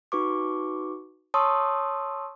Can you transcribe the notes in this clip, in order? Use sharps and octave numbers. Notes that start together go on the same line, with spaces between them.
D#4 F#4 B4 C#6 D6
C#5 A5 C6 C#6 D#6 E6